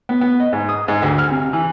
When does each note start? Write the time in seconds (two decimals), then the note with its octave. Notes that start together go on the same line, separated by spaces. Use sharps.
0.09 B3
0.21 B3
0.40 D#5
0.53 G#2
0.69 D#6
0.88 G#2
1.02 D2
1.18 F6
1.31 C3
1.53 E3